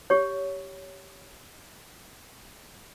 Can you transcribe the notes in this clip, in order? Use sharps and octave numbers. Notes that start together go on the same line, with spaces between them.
G4 C#5